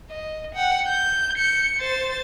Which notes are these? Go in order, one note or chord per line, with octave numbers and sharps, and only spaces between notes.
D#5
F#5 G5
G6
G6 C#7
C5 A6